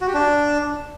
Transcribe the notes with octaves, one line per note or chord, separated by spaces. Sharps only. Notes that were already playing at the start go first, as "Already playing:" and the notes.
F#4
G4
D4